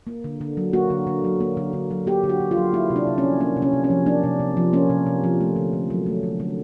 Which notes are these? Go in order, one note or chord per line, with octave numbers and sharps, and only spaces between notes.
A#3
D3
D3
F#3
A#3 F#4
D3
D3
F#3
A#3
D3
D3
F#3
A#3 G4
D3
F#4
D3
F4
F#3
A#3 E4
C3
D4
C3
C#4
F3
A#3 D4
C3
C#4
C3
C#4
F3
A#3 D4
C3
C3
F3
A#3 C#4
C3
C3
F3
A3
D3
D3
F#3
A3
D3
D3